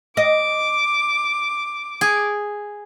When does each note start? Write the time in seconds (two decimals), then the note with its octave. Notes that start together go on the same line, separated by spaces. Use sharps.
0.17 D#5 D6
2.01 G#4